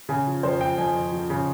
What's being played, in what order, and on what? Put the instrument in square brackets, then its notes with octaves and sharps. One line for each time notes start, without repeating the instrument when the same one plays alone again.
[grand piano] C#3 G#5
F3
F2 C5
F3 G5
F2 G#5
F2
F3
C#3